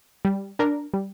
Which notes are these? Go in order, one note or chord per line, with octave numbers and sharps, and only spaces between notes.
G3
D4 A#4
G3